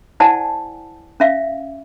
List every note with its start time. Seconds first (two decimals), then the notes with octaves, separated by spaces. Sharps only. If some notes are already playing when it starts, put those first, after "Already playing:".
0.20 E4 C5 D5 F#5 G#5 A5
1.20 C#4 E5 F5